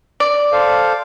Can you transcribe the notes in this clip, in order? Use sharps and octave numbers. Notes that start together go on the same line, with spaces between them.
D5
A4 C5 F5